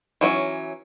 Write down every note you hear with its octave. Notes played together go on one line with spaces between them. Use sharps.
E3 F#3 C#4